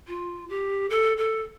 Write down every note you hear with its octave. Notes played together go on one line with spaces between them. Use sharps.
F4
G4
A4
A4